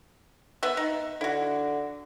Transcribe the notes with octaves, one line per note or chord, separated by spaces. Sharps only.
B3 B4 E5
D#4
D3 E4 F#4